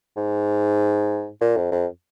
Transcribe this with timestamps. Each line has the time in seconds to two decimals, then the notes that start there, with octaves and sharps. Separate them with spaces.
0.17 G#2
1.41 A#2
1.57 F2
1.72 F2